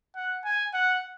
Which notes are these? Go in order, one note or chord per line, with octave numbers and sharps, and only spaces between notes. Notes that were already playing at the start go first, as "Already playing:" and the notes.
F#5
G#5
F#5